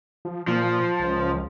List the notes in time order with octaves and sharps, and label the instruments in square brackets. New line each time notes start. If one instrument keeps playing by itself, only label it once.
[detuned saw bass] F3
[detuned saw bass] A#2 [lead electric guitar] F3
[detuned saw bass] C#2